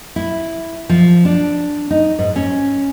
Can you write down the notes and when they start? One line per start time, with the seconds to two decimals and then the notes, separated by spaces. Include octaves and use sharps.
0.16 E4
0.89 F3
1.25 D4
1.91 D#4
2.19 G#2
2.36 C#4